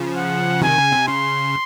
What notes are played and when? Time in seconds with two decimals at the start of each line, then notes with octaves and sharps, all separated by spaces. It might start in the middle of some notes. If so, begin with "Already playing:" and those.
Already playing: C#3 F3
0.16 F#5
0.62 C3 D#3 G#5
0.78 C#3
0.92 C3
1.08 C#3 C6